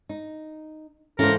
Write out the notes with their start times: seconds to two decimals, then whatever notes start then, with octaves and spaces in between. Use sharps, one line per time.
0.09 D#4
1.19 G#2 C#3 E3 C#4 A4 A#4 C5